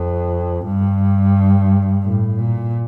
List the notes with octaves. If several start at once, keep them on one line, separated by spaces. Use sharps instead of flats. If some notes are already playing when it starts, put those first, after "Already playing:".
Already playing: F2
G2
A2
A#2